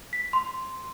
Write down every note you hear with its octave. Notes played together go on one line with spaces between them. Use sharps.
B6
C6